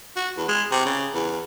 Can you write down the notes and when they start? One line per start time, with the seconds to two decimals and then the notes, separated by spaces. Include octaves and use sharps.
0.16 F#4
0.37 E2
0.48 G#3
0.72 C3
0.85 C#3
1.14 E2